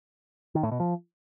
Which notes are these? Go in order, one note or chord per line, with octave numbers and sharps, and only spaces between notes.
D#3
A2
B2
F3